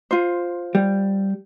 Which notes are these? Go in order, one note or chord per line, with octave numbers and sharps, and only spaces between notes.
F4 C5
G3